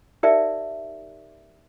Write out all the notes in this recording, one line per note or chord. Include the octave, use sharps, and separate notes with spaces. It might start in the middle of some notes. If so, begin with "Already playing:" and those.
D#4 G4 A#4 D5 E5